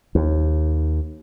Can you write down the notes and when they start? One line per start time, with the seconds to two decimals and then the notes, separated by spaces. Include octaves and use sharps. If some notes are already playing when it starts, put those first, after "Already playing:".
0.15 D#2